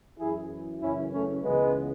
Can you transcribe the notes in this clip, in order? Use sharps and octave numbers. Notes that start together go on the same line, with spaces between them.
F#2 E3 E4 G#4
F#2 C#3 E3 C#4 E4
A3 C#4
C#2 C#3 E3 G#3 B3